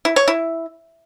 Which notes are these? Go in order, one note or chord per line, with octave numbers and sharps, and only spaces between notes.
E4
C#5
E4